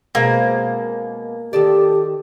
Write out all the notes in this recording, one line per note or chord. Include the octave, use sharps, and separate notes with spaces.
B2 G#3 A#3 C4
D#3 G4 A4 D5